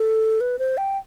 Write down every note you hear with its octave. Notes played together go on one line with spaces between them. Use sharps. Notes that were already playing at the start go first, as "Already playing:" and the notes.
Already playing: A4
B4
C5
G5